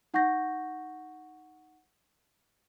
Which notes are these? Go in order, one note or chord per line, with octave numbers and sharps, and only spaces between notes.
D#4 F#5 C#6 G6 A#6